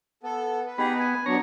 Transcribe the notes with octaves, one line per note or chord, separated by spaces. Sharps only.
B3 A4
B4
B3 D#4 G4 G#4
G#5
F#3 B3 D4 C#5 A#5